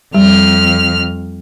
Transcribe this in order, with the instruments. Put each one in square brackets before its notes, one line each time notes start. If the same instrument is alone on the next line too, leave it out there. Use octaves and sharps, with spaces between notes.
[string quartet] F2 F6 [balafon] G3